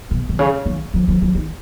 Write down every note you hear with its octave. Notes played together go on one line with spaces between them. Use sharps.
B2
B2
C#3
D#3
F3
F3
F3
D#3